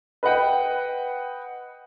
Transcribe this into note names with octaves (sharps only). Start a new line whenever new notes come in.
B4 D#5 F#5 G5